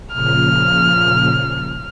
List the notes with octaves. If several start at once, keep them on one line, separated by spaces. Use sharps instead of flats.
A#2 C#3 F3 F6